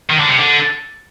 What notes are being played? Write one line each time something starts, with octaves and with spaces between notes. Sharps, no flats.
D#3
D3
C3
D3